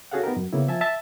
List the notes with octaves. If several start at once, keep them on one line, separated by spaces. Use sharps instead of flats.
C#4 F#4 G#4 A4 F5 F#5
B3 D#4 G4 A#4
F#2
C#3 A#3 B3 E4
F3 E5 G#5 A5
E5 A5